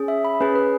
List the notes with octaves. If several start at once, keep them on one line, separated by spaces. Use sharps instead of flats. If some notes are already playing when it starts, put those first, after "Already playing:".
Already playing: C#4 G#4
E5
B5
C#4 G#4 B4
B4